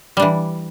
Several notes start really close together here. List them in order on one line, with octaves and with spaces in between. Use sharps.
G3 D4 E3